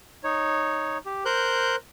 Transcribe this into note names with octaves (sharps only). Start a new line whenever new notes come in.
D#4 C#5
G4
A#4 C5 F#6 G6